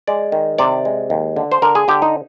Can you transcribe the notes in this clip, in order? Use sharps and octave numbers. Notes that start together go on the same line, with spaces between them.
G#3 D5
D#3
C3 D5
G#3
D#2
D3
C5
D3 A#4
G#4
D3 G4
D#4